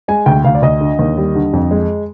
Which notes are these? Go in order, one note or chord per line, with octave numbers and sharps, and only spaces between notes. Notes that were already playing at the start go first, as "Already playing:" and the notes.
G#3 G#5
D2 G5
D2 F5
D5
D2 D#5
D3
D#2
G3
D3
F2
G#3